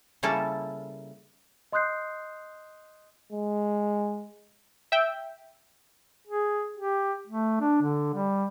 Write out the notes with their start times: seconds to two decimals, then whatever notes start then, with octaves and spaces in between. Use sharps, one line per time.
0.23 C#3 G3 A#3 E4 A4
1.72 D#5 C6 D#6 F#6 G6 C7
3.32 G#3
4.92 E5 G5
6.26 G#4
6.77 G4
7.27 A3
7.60 D4
7.82 D3
8.14 G3